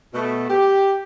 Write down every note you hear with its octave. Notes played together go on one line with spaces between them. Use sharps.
B2 A3
G4